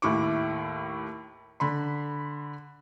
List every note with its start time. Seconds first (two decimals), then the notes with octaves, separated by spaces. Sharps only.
0.02 D#2 A2 E4 C#6 D6
1.60 D3 B5 C6